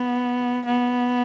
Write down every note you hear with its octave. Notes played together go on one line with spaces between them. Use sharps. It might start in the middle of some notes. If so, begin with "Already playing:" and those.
Already playing: B3
B3